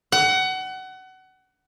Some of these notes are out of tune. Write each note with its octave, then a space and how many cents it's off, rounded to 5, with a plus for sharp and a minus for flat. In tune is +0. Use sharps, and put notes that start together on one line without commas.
F#5 +25